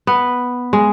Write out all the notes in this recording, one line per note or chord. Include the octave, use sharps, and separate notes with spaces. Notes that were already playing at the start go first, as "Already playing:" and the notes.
B3
G#3